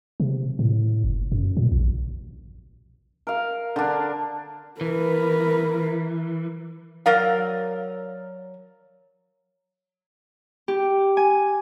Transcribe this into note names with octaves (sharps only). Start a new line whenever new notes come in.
C3
A2
F#1
F#2
A#2
A#1
A#4 F5
D3 D4
E3 A#4 B4
F#3 A#4 D5 F5
G4
G#5